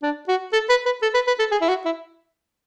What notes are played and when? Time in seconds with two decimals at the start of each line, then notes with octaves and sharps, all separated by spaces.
0.03 D4
0.28 F#4
0.53 A4
0.69 B4
0.85 B4
1.02 A4
1.14 B4
1.27 B4
1.39 A4
1.52 G#4
1.61 E4
1.69 F#4
1.85 E4